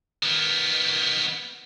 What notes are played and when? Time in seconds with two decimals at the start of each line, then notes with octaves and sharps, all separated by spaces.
0.23 D#3 B3